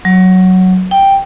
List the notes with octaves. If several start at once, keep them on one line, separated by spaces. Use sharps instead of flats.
F#3
G5